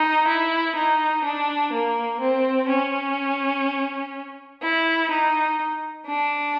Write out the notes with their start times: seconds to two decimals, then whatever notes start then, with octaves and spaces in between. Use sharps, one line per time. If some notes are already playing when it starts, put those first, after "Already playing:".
Already playing: D#4
0.27 E4
0.75 D#4
1.24 D4
1.72 A#3
2.21 C4
2.68 C#4
4.62 E4
5.10 D#4
6.07 D4